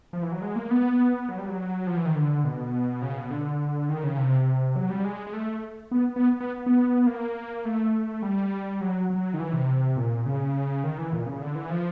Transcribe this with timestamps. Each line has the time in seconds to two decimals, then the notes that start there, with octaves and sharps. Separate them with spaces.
0.13 F3
0.23 E3
0.32 F#3
0.42 G#3
0.56 A#3
0.70 B3
1.29 F#3
1.38 G3
1.49 F#3
1.87 F3
1.97 E3
2.06 D#3
2.15 D3
2.44 B2
3.02 C#3
3.17 B2
3.31 D3
3.89 D#3
4.04 C#3
4.17 C3
4.76 F#3
4.90 G3
5.04 G#3
5.27 G#3
5.33 A3
5.91 B3
6.16 B3
6.40 B3
6.66 B3
7.07 A#3
7.65 A3
8.22 G3
8.81 F#3
9.10 F#3
9.34 D#3
9.39 E3
9.53 C3
9.97 A#2
10.26 C#3
10.84 D#3
10.98 E3
11.13 A#2
11.26 C#3
11.42 D3
11.55 E3
11.70 F3